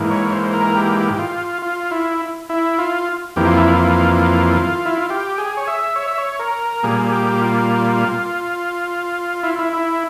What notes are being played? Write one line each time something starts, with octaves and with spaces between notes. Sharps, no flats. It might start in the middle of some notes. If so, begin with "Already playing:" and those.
Already playing: G#2 E3 A#3
C#5
C5
A#4
G4
G4
F4
F4
E4
E4
F4
F2 E3 A#3 G4
F4
E4
F4
E4
F4
G4
G#4
C#5
E5
C#5
E5
C#5
A#4
A#2 G3 A#3 G#4
G#4
G4
F4
E4
E4
E4